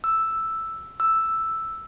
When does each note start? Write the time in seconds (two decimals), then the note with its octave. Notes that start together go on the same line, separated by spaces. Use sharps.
0.04 E6
1.00 E6